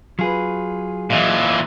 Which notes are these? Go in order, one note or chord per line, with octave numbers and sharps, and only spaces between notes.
F#3 F4 G#4 B4
A#2 E3 D#5 F5